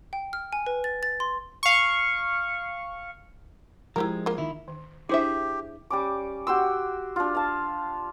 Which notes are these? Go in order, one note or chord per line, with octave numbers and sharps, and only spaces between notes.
G5
F6
G#5
B4
A6
A6
C6
F5 C#6
F3 G#3 E4 G4 A#4
A#3 F4
D#3 E4
D#3
D4 E4 G4 G#4 C5 E5
G3 C#4 D6
F#4 G4 C6 E6
D4 F4
F5 A5